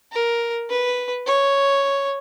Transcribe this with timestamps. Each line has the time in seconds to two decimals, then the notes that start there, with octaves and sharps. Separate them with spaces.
0.12 A#4
0.70 B4
1.26 C#5